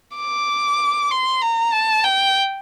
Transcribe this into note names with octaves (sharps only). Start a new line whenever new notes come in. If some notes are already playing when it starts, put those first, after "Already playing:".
D6
C6
A#5
A5
G5